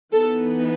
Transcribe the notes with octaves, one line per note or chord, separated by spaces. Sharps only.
E3 B3 D#4 A4